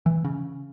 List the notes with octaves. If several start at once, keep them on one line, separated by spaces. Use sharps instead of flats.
E3
C#3